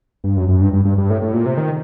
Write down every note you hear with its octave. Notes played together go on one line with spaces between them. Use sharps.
G2
F#2
F#2
G2
G2
G2
G2
A2
A2
A#2
C3
D#3